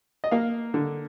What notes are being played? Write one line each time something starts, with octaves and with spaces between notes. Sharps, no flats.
D#5
A#3 F5
D3